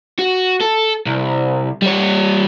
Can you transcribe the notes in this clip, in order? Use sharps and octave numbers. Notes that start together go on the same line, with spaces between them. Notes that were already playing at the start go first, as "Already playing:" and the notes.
F#4
A4
C2
G3 C#5